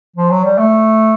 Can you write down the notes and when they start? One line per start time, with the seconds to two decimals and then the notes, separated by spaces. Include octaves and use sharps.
0.16 F3
0.31 F#3
0.45 G3
0.58 A3